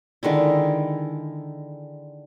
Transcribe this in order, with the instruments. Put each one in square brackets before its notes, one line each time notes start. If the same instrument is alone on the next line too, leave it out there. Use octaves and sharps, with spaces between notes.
[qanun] D3 D#3 G#3 E4